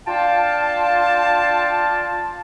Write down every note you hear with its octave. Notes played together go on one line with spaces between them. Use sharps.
D4 F4 F5 G5 A5